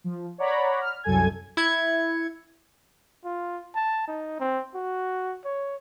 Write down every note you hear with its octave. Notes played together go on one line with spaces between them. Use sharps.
F3
C#5 D5 F#5 A#5 B5
F6
C2 F#2 A4 G#5 G#6
E4 G#6 C#7
F4
A5
D#4
C4
F#4
C#5